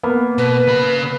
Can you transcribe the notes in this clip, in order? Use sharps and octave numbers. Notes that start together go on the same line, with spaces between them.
A#3 B3
B2 B4
C#3 B5